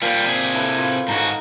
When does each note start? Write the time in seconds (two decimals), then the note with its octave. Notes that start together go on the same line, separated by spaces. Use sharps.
0.02 A#2 F3 G3 F4
0.25 C3 G#4
0.54 E4 A4 B4
0.79 F3 B5
1.08 G#2 D#4 F#4 A4 A#5